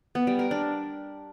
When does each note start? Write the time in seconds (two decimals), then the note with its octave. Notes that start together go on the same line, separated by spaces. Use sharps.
0.15 B3
0.27 G3
0.39 A#4
0.51 D4